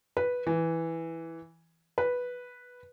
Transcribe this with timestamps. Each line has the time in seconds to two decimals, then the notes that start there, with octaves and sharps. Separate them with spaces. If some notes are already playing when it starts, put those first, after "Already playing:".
0.17 B4
0.47 E3
1.98 B4